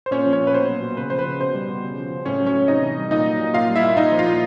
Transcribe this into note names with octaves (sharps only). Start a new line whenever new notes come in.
C5
A#2 C#4 C#5
F3
C#4 C#5
A#2
B4
B2 C5
F#3
B2
C#3 B4
F3 C5
B4
C#3
B2 C5
G3
B2
C#3
F3
C#3
A2 C#4 C#5
F#3
C#4 C#5
A2
C3 D#4 D#5
E3
G3
A#2 D#4 D#5
F#3
A#2
A#2 F4 F5
G3
E4 E5
A#2
A#2 D#4 D#5
F3
F4 F5
A#2